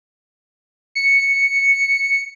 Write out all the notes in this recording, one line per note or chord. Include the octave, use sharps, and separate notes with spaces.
C#7